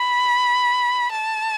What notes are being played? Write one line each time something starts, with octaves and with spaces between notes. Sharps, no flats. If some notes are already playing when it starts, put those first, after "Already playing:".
Already playing: B5
A5